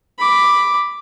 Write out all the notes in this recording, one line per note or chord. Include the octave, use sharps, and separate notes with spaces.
B5 D6